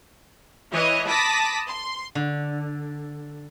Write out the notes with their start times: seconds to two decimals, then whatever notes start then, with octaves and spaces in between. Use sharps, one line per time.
0.72 E3 C#5 D#5
1.07 A5 B5 D6 D#6 A#6 B6
1.67 C6
2.15 D3